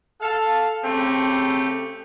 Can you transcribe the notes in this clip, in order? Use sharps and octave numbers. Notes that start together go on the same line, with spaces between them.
A4 F5
C#3 A3 C4 G4